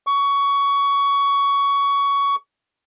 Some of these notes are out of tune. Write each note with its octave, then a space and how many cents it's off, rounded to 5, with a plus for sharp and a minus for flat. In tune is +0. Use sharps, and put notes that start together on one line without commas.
C#6 +20